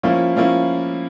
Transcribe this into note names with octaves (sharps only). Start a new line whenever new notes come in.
F3 A#3 C#4 E4
F3 A#3 C#4 E4